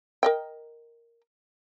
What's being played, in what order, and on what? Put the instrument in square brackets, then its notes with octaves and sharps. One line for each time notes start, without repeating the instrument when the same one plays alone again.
[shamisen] A#4 D#5 G5